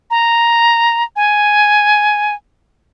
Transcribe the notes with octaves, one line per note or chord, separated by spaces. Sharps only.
A#5
G#5